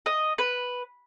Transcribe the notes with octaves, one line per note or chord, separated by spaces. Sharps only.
D#5
B4